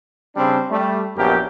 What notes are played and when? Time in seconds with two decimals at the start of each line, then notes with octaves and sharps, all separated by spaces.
0.35 C#3 G3 C4 D4
0.69 G3 A3
1.17 A#1 F#2 B3 G4 A#4